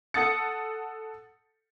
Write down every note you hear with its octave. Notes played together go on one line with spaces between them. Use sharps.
A4 F#5 D#6 A6 C#7